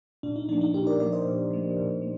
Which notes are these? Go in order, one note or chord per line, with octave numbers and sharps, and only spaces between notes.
A#2 D4
D#4
F3 A#3 D4
D#4
A#2 D#4 G4
A#4 D5
F3 A#3 A#4 D5
C5 D#5
A#2
F3 A#3
A#2
A#3